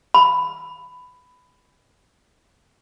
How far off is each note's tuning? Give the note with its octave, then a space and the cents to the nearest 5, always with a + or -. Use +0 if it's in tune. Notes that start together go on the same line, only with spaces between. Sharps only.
B5 +10